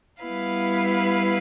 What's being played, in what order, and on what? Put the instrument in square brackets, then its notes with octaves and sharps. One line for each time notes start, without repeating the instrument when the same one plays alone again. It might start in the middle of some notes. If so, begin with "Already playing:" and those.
[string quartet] G3 B3 E4 B4 F5